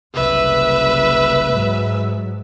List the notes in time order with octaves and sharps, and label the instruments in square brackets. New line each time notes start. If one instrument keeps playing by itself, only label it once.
[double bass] F#1 C2 [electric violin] B4 E5
[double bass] G#2 F#3